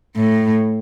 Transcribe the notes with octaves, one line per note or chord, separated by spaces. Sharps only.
A2